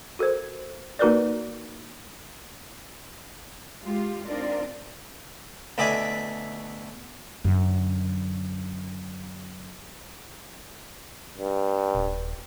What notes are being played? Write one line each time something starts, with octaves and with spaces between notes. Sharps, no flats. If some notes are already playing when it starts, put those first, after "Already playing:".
F#4 A4 A#4 C5
A#3 D#4 F#4 A#4 B4 D5
G#3 F4 G4
C4 D4 D#4 F4 A#4 D5
D2 B2 E4 D5 E5 G#5
F#2 D3
G2
D#1